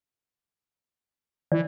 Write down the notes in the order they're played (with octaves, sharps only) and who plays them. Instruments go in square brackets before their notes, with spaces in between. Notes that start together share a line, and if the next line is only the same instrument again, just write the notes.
[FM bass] E3 [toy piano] D5